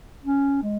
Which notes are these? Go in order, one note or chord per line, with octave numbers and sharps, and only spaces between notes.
C#4
G#3